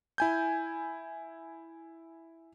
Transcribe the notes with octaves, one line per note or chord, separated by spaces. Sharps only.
E4 G#5 G6